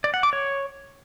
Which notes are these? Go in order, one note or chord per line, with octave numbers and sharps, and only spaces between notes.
D5
F#5
D6
C#5